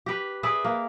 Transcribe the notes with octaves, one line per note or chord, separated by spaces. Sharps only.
G4 B4
G#4 B4 D5 E5
A#3